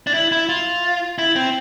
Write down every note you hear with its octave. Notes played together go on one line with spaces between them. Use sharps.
D4
E4
E4
F4
E4
C4